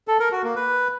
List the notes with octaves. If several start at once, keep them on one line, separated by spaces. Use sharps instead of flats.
A4
A#4
F#4
A#3
B4